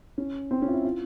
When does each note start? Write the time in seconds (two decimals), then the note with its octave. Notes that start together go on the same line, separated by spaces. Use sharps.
0.18 C#4
0.51 C4
0.62 C#4
0.68 F4
0.73 E4
0.85 F4